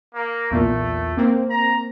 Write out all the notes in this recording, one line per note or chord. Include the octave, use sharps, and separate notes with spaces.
A#3
B1 E2 A#2 A3
A#3 C4
A#5